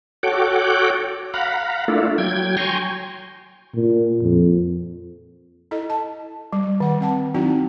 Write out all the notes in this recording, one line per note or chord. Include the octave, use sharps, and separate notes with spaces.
F#4 A4 C#5 F#5 G5 D6
F5 F#5 A#5 B5
A3 A#3 D4 E4 F4 A4
F#3 G5 G#6
G5 G#5 A#5 C6 C#6
A#2
F2
E4 A4 D#5
A5
G3
D#3 F#5
C4 F#5 A5
F#3 C4 D#4 E4 F#4